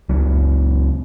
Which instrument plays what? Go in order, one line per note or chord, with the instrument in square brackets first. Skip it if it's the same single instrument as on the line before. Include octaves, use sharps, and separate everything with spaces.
[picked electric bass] C#2 F#3